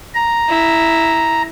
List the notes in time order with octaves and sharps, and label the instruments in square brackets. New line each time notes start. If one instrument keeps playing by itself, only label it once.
[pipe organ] A#5
[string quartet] E4